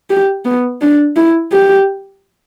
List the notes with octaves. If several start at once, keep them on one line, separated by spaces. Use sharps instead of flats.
G4
B3
D4
E4
G4